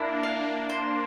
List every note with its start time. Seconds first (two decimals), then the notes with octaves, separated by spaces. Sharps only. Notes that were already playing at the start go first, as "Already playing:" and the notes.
Already playing: A#3 D4 E4
0.23 F5
0.69 A#3 D4 C5